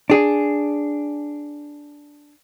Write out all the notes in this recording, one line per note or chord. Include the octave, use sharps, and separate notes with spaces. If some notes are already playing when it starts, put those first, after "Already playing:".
D4 G#4